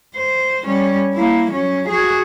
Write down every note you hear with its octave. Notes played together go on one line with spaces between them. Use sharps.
C5
G3 C#4
A#3 E4
F#3 C#4
F#4 G#4